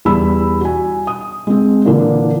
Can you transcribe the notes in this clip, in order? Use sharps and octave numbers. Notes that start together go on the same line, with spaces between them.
E2 G3 E4 B5 E6
F#4 G#5
D#6
G#3 C4
A#2 D3 E3 A#3 D4